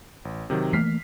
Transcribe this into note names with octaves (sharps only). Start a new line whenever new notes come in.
A1
C3 D#3 F#3
E3 A3 A#3 F6 B6 C7